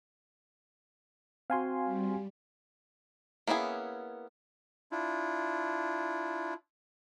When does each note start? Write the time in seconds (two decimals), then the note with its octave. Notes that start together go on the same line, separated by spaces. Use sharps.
1.50 C4 F#4 F5 G#5 C6
1.83 G3
3.47 A#3 B3 C#4 E4 G#4
4.92 D4 E4 F4